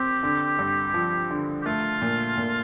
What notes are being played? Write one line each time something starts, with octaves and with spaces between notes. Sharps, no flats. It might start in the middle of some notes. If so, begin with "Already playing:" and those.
Already playing: C4 G4
D3
G2
F3
D3
G4
A3 F4
A#2
A#2